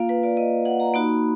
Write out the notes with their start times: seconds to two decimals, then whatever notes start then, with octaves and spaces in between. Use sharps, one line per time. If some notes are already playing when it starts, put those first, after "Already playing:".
Already playing: A#3 F4 F5
0.09 B4
0.23 D5
0.37 D#5
0.65 F#5
0.80 A#5
0.94 A#3 D#4 F#4 B5